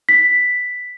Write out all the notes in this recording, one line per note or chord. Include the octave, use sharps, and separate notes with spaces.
B6